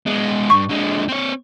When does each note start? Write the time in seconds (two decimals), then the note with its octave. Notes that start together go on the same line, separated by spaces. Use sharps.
0.06 G#3 B3
0.50 E2 G2 C#6
0.69 D3 G#3
1.09 C4 C#5